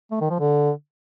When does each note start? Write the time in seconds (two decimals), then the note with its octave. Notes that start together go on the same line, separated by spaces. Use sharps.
0.12 A3
0.21 D#3
0.30 F3
0.40 D3